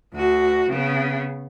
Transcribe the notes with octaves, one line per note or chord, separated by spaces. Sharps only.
D2 F#4
C#3 B3